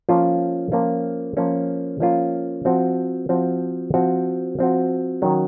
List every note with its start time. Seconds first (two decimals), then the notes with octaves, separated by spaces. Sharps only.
0.09 F3 A#3 C#4 F4
0.72 F3 A#3 C#4 F4
1.37 F3 A#3 C#4 F4
2.00 F3 A#3 C#4 F4
2.65 F3 C4 F#4
3.29 F3 C4 F#4
3.94 F3 C4 F#4
4.59 F3 C4 F#4
5.22 D#3 F#3 C#4